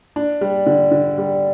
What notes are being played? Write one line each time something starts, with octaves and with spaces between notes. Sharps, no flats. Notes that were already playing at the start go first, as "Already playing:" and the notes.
D4
G3
D3
D3
G3